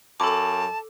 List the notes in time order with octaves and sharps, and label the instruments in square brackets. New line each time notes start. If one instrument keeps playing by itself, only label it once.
[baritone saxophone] F#2 [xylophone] A4 D6 [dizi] A5